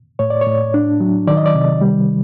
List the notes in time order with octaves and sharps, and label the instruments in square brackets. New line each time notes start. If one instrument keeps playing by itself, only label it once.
[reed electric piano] A2 C#5
D5
C#5
A2
D4
F#3
D#3 D5
D#5
D5
C3
G3